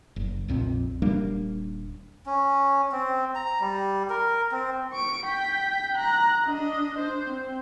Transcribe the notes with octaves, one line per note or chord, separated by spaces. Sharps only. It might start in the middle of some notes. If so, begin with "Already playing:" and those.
F#1
A#1 F2 A#2 C4
D#1 G3 A#3 D4
C#4
C4
A#5
G3
A#4
C4
C#6 D7
G5 B6
A#5 F#6
D4 D#5
D4 C5
C4